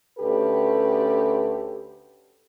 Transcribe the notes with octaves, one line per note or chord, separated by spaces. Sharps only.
D2 C#4 G4 A4 B4